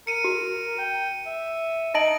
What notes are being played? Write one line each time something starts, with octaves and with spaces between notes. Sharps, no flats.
A#4 C#7 D#7
F#4
G5
E5
D#4 D#5 A5 A#6 D7 F#7